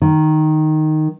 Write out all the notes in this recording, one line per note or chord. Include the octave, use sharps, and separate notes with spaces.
D#3